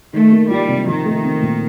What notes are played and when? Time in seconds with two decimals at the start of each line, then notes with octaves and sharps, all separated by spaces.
0.13 D#3 A3
0.32 A#3
0.50 G3 F4
0.68 C3
0.87 D#3 F3
1.05 A3
1.24 C4
1.42 A#2